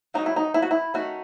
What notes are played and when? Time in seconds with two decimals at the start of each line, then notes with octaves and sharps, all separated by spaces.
0.14 F#3 C#4 D#4
0.26 E4
0.36 D#4
0.54 E4
0.62 F#4
0.71 E4
0.94 D#3 A3 C#4 F#4